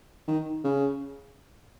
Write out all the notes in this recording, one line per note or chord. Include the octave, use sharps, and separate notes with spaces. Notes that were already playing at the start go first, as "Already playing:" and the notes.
D#3
C#3